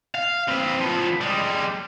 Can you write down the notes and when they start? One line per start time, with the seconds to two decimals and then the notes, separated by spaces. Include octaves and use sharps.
0.15 F5
0.49 C4 B4
0.79 F3 B3
1.21 G3 G#3